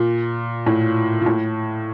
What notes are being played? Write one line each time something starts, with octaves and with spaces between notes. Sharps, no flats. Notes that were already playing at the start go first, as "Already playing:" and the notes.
Already playing: A#2
A2
A#2
A2